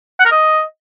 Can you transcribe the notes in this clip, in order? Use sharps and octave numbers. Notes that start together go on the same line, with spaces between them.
F#5
A#4
D#5